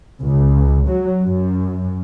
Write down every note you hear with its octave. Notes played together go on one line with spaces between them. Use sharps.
C#2
F#3
F#2